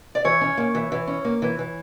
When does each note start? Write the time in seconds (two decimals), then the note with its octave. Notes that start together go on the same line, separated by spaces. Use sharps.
0.15 D5
0.24 E3 C#5
0.41 C#4
0.58 A#3
0.75 E3
0.92 E3
1.08 C#4
1.25 A#3
1.42 E3
1.59 E3